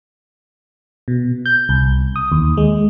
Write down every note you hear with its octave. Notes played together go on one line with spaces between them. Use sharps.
B2
G6
C2
D#6
D#2
G#3